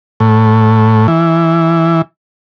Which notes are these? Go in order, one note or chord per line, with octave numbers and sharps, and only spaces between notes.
A2
E3